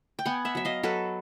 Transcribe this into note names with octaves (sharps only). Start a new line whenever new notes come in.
G5
B3 F#5 G#5
E5 F#5
F#3 E5
D#5 F5
F#3 A4 B4